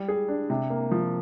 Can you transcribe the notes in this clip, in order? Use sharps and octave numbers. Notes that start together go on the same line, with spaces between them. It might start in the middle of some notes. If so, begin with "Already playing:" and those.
Already playing: G3
G#4
D4
C3
A#3
F3